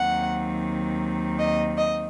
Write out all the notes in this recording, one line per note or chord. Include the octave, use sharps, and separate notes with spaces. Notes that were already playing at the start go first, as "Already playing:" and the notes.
Already playing: D#2 D#3 F#3 C4 F#5
D#5
D#5